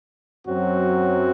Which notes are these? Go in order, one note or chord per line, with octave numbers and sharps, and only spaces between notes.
F#2 F#3 C4 F#4